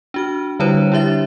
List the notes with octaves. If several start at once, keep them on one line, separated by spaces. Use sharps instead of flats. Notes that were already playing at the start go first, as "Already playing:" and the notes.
D4 F#4 F6
D3 G3 D4 E4 B4 C#5
D4 E4 G4 E5 A6